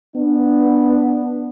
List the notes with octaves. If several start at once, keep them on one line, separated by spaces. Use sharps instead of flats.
B3 D4